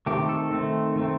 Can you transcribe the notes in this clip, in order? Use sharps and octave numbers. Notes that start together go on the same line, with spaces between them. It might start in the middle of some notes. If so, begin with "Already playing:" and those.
D#3 A3 C4 G4
A4
D#3 A3 C4
D#3 A3 C4